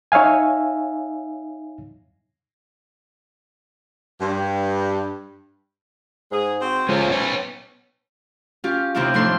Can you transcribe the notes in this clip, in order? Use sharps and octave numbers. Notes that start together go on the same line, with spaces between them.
D#4 C#5 E5 F5 G#5
G2
G#2 G#3 G#4
C4 F#4 C5
G#3 A3 C#4 F4 C5
B3 C#5
C#4 F4 G4
D#2 C3 C4 E4 F4 G4
F2 A2 D4 C6 G6